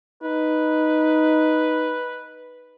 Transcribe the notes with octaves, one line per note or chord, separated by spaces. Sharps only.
D#4 B4